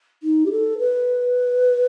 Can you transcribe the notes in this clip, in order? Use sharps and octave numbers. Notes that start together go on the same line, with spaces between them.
D#4
G4
A4
B4